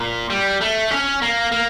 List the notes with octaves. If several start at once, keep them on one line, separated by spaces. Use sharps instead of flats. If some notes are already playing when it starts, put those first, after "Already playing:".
Already playing: A#2
G3
A3
C#4
A#3
A#3